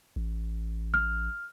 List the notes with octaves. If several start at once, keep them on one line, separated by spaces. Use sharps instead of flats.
A1
F6